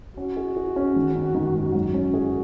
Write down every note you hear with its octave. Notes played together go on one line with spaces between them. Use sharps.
C#4 F#4
G#4
G#4
C#4
D#3
D#3
D#3
G#2
F#3 F#4
C#4
G#4